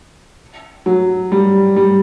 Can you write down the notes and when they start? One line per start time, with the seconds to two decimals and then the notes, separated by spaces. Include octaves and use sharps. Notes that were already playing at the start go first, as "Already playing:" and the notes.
0.86 F#3
1.32 G3
1.76 G3